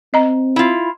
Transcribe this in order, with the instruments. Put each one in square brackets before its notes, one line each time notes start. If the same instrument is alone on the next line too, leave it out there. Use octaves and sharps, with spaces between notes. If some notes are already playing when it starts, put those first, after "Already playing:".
[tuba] C4 [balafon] D#5 A#5
[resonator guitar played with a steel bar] E4 F4